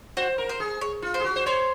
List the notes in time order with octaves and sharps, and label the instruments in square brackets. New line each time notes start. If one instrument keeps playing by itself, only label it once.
[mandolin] F#4 [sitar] C5
[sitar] A#4
[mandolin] C5
[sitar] G#4
[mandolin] C#5
[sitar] F4
[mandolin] C5
[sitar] G#4
F#4
C5
[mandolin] C5 [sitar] C#5